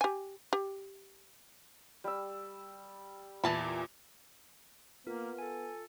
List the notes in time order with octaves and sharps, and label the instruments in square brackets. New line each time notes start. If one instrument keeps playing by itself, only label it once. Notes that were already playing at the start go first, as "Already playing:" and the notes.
[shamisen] G4 G#5
G4
[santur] G3 E6
[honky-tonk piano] E2 A#2 [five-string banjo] E3 A5 B5
[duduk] A#3 [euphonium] B3 [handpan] F4 [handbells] A#4
[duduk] A4 [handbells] G#5